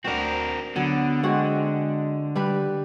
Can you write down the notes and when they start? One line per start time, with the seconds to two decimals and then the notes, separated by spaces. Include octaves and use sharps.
0.05 D2 C4 D4 F#4 A#4
0.76 D3 F#3 B3
1.23 G#3 C4 F#4 G#4
2.36 G3 D4 B4